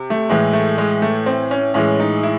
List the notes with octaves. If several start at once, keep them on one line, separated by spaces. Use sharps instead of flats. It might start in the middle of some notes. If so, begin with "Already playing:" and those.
Already playing: C3
A3
A2 E3 G#3
A3
G#3
A3
C4
C#4
A2 E3 G#3 C#4
D#4
E4